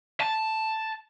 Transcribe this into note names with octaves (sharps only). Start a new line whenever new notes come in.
A5